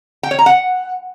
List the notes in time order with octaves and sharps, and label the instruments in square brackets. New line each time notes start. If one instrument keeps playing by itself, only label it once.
[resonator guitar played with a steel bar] G5
C#5
A#5
F#5